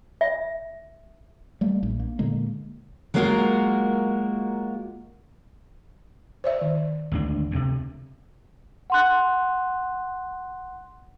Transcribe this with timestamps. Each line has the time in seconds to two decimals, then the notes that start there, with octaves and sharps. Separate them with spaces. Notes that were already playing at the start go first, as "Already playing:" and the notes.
0.21 E5
1.61 G3 A3 A#3
1.83 A#1
2.00 A#3
2.19 A#2 D3 G#3 A#3
3.14 F#3 G#3 A#3 F4 F#4 A#4
6.44 C5 D5 E5
6.61 D#3
7.12 G#1 D2 D4
7.51 D2 C3
8.90 F#5 C6 F#6